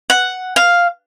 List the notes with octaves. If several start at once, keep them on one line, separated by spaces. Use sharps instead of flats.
F#5
F5